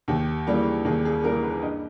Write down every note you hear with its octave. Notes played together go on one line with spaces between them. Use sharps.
D#2 G4
C#3 E3 G3 A#3
D#2 G#4
G#4
C#3 E3 G3 A#3 A#4
B4
G2 D#5